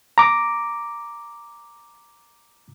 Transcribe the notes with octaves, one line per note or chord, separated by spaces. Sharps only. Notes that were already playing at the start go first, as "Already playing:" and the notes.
A#5 D6